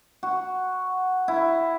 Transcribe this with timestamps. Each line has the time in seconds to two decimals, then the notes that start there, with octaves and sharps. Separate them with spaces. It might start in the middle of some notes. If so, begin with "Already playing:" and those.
0.23 F#4
1.28 E4